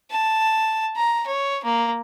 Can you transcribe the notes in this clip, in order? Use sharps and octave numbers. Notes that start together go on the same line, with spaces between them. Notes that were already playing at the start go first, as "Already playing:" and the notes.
A5
A#5
C#5
A#3